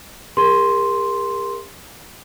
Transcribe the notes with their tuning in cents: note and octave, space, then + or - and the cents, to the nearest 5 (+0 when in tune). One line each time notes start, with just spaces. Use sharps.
G4 +45 A#4 +5 C6 +0